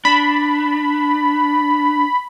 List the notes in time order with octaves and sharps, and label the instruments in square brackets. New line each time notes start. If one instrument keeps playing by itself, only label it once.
[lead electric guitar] D4 [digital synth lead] B5